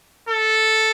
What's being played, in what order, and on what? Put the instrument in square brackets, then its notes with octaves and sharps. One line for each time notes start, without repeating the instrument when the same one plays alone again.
[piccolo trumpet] A4